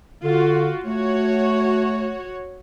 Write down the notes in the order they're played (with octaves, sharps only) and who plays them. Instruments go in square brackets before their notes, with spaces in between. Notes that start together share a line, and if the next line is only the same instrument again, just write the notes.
[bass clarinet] D3 [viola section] F4 F#4
[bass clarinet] A3 [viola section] F#4 C#5